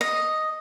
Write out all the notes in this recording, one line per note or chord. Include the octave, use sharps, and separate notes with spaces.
D#5